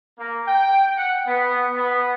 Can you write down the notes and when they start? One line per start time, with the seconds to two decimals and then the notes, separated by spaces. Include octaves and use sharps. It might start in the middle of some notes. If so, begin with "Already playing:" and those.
0.19 A#3
0.47 G5
0.97 F#5
1.27 B3
1.76 B3